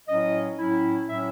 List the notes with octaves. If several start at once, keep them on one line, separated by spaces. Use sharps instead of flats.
A2 F#3 C#4 E4 D#5
A2 F#3 C#4 E4
A2 F#3 C#4 E4 E5